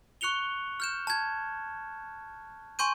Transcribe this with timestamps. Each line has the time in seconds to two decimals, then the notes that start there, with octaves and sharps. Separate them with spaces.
0.21 C#6 F#6 C#7 F7 G7
0.80 F6 G6 E7
1.07 A5 G#6
2.79 G#5 C6 C#6 G6 D#7